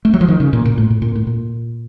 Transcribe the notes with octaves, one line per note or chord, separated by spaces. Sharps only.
A3
F#3
F3
D#3
C#3
A#2
A#2
A2
A2
A#2
A2
A#2